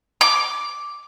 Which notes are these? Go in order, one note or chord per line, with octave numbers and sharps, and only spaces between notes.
D6